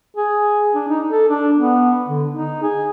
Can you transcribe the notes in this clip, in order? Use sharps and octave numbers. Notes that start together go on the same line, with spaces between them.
G#4
D4
D#4
A4
D4
B3
D3
D#4
G#4